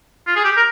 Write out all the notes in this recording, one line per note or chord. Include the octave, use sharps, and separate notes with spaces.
F4
G#4
G4
A#4